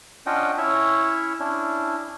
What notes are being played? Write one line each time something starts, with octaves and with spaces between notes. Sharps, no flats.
C#4 D4 F4 D#5 F#5 G5
C#4 E4 C#5 E5
C#4 D4 E4